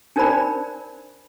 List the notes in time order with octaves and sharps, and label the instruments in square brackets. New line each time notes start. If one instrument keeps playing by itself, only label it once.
[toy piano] D4 D#4 A#4 C5 D5 B5